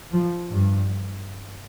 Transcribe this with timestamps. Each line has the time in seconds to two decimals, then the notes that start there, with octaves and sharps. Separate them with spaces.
0.12 F3
0.49 G2